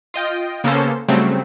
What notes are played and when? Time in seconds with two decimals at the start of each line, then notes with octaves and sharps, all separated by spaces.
0.14 F4 D#5 G5
0.64 C#3 A#3 B3 C#4 A4 C5
1.08 C#3 F#3 G3 A3 C4